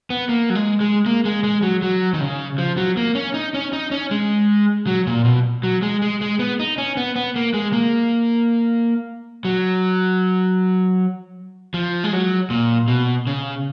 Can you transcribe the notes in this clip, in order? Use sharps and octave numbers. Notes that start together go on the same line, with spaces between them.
B3
A#3
F#3
G#3
G#3
A#3
G#3
G#3
F#3
F#3
D#3
C#3
F3
F#3
A#3
C#4
D#4
C#4
D#4
C#4
G#3
F#3
A#2
B2
F#3
G#3
G#3
G#3
B3
D#4
C#4
B3
B3
A#3
G#3
A#3
F#3
F3
G#3
F#3
A#2
B2
C#3